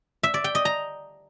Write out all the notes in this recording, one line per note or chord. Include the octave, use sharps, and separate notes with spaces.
E5
D5
G5
D#5
A#5